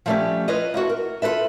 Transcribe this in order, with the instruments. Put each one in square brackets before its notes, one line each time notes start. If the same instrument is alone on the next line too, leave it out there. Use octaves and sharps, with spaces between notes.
[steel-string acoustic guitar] F3 G3 A3 C4 C#4 G4
F4 B4 C#5 D#5
A#3 E4 F#4 A4
A#4
F4 F#4 A4 B4 E5